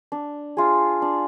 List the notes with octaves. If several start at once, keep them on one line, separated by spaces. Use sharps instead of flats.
D4
F4 G#4
D4